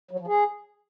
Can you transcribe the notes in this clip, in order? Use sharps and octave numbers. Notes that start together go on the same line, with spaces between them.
F#3
F3
G#4